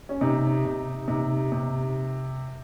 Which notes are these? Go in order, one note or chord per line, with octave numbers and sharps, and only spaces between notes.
C#4
C3 D#4
C3
C3 D#4
C3